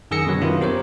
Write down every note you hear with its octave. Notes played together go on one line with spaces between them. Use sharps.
F#2 D#3 G#4 E6 A#6 C#7
F#2 B2 D3 F#3
F#2 D#3 G3 B3 E4 F4
C4 G4 A#4 C5 C#5